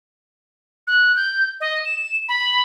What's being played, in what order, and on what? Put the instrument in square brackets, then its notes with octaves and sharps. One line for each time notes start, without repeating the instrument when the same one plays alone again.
[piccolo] F#6
G6
D#5
E7
B5